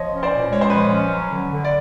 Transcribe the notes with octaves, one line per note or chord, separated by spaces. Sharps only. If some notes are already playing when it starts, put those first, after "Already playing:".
Already playing: F3 C#5 D#5
C#4
C5 D5
A#2
G#3 C#5
C5
F3 B4 C#5
C#4
F#3
D3
D3
D5